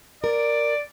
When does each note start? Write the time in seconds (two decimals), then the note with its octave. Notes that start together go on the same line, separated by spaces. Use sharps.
0.24 A#4 D5